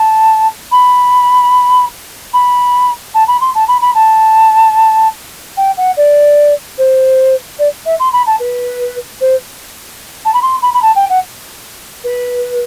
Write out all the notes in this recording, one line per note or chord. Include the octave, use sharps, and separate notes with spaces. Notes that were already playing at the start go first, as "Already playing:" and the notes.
Already playing: A5
B5
B5
A5
B5
C6
A5
B5
B5
A5
G5
F#5
D5
C5
D5
E5
C6
B5
A5
B4
C5
A5
B5
C6
B5
B5
A5
G5
F#5
B4